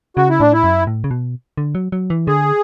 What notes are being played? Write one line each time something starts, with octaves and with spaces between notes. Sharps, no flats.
C#3 F#4
E4
A2 D4
E4
F#2
A2
C#3
B2
D3
F#3
F#3
E3
D3 G#4